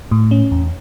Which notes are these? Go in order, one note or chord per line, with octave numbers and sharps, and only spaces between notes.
A2
C#4
E2